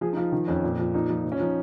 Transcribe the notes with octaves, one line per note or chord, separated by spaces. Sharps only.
F3 G#4
D#4
F3 F4
D#3
F2 C#4
A#2
F3
A#2 D#4
F3
F3
C#4
F3 D#4